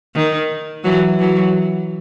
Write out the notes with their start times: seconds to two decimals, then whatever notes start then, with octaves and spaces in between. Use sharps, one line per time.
0.15 D#3
0.84 E3 F#3
1.19 E3 F#3